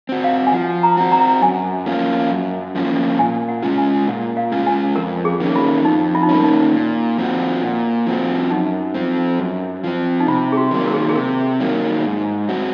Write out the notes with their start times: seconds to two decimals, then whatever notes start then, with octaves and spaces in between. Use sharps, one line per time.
0.09 C4 F#4
0.24 F5
0.47 G#5
0.53 F3 F#5
0.83 A#5
0.97 C4 F#4
1.12 A#5
1.41 F#2 G#5
1.86 F3 A#3 C#4 F4
2.30 F#2
2.75 F3 A#3 C#4 F4
3.19 A#2 G#5
3.48 F#5
3.63 G#3 C#4 F4
3.78 G#5
4.08 A#2 F#5
4.37 F5
4.52 G#3 C#4 F4
4.66 G#5
4.96 F2 A#4
5.25 G#4
5.40 D#3 A#3 C#4
5.56 F4
5.84 F2 D#4
6.15 F4
6.23 D#4
6.29 D#3 A#3 C#4 F4
6.44 D#4
6.74 A#2
7.18 F3 C4 F#4
7.62 A#2
8.06 F3 C4 F#4
8.51 F#2 D#4
8.94 F3 C4
9.39 F#2
9.84 F3 C4
10.20 D#4
10.27 C3 F4
10.52 G#4
10.57 F#4
10.71 D#3 F#3 A#3
10.87 A#4
10.93 G#4
11.02 F#4
11.09 G#4
11.16 C3 A#4
11.60 D#3 F#3 A#3
12.05 G#2
12.49 F#3 C4 F#4